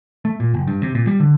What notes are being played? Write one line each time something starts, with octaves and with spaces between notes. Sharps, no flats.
A3
A#2
F#1
G2
C3
A#2
G3
D3